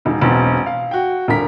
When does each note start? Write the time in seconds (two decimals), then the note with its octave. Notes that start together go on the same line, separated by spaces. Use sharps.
0.05 E1 D#3
0.21 E1 B1 B2 C4
0.66 F5
0.91 F#4 G5
1.28 D#1 D3 A#4 B6